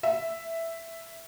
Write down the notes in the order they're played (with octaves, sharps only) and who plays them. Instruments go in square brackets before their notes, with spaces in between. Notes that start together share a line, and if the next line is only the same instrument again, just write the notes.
[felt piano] E5